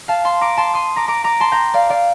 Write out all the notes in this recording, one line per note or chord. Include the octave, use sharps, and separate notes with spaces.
F5 A5
A5 C6
A#5 D6
A5 C6
C6 D#6
A#5 D6
A#5 D6
A#5 D6
A5 C6
G5 A#5
D5 F5
D5 F5